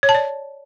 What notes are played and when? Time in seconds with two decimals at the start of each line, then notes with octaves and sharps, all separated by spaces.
0.03 C#5
0.09 A5
0.15 D5